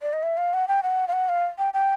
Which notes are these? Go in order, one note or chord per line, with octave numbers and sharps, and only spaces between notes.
D5
D#5
E5
F5
F#5
G5
F#5
F5
F#5
F5
G5
G5